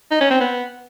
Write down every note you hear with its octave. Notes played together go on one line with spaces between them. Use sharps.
D#4
C#4
C4
B3